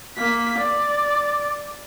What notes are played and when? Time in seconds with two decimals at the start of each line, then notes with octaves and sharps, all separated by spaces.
0.17 A#3 B6
0.58 D5